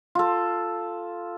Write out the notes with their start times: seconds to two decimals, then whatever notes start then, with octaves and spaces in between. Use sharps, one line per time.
0.15 F4 A4